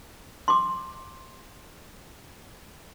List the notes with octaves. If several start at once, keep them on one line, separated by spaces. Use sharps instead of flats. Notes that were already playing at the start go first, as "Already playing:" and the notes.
C6 D6